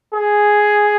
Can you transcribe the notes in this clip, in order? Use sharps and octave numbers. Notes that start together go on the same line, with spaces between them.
G#4